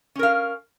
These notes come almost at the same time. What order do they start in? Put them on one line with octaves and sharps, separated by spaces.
C#4 A#4 F5